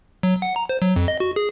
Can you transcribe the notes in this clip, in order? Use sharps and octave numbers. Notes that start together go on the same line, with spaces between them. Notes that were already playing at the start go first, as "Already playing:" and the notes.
F#3
F#5
A#5
C5
F#3
F2
D#5
F#4
G#4